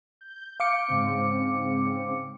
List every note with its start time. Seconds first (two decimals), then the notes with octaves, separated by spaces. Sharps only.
0.21 G6
0.60 F5 D6 C#7
0.88 G#2 C#3 C4